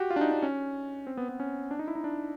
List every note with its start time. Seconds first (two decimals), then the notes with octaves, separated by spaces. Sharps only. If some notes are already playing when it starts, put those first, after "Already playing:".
Already playing: F#4 G4
0.10 F4
0.16 D4
0.21 D#4
0.31 D4
0.43 C#4
1.07 C4
1.17 B3
1.29 B3
1.40 C#4
1.71 D4
1.79 D#4
1.88 E4
1.95 D#4
2.04 D4